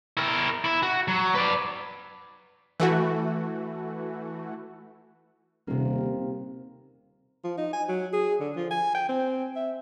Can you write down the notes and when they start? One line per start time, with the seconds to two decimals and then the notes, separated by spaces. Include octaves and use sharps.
0.17 E4 A#4
0.64 E4
0.83 F#4
1.08 F#3
1.35 B4 D5
2.80 E3 A3 F#4
5.67 D#1 C3 A#3
7.44 F3
7.58 D#4
7.73 G#5
7.89 F#3
8.13 G#4
8.40 D3
8.56 F3
8.71 G#5
8.94 G5
9.09 C4
9.56 E5